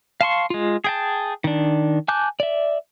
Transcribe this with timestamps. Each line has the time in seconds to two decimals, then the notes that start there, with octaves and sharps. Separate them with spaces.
0.21 F5 A5 C6 C#6
0.50 G#3 F4
0.84 G#4 G5 A5
1.44 D#3 D4
2.08 G#5 A5 D6 F#6 G6
2.40 D5 E5